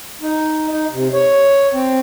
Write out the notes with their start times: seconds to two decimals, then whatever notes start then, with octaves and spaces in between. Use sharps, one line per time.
0.22 D#4
0.70 D#4
0.92 C3
1.13 C#5
1.73 C4